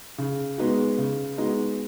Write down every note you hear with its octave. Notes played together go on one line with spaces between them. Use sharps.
C#3
G#3 B3 D#4 F#4
C#3
G#3 B3 D#4 F#4